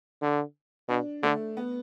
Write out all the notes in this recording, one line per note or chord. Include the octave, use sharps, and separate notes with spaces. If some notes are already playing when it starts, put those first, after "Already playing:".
D3
B2 D4
D3 A3
B3